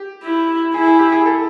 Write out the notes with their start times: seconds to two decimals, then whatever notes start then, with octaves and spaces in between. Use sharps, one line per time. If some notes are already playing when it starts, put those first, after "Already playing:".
Already playing: G4
0.24 E4
0.74 E4 G#4
0.86 G#4
0.99 G4
1.12 G#4
1.26 A4